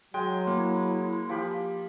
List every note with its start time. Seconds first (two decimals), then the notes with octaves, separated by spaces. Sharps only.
0.14 F#3 G#3 C#5 G5
0.47 A#3 E4
1.29 F3 G4 B5